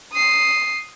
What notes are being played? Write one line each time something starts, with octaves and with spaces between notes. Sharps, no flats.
D#6 C7